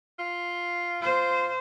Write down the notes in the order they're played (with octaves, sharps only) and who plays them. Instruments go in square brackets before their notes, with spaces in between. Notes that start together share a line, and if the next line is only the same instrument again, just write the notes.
[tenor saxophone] F4
[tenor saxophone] F4 [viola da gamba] C5